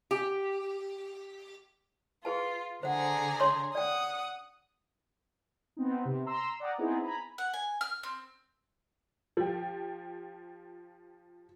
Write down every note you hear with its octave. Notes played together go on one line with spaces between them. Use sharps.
G4
F4 G#4 B4 A5
D3 G#4 C5 F#5 A#5
C#5 C6 C#6
D5 F#5 G5 D#6
B3 C4 D#4
C3
A#5 C6 E6
D5 F#5 G5 A#5 D#6
B3 C4 D#4 E4 G#4
G#5 A#5 B5
F#5
G#5
F6
C4
F3 G4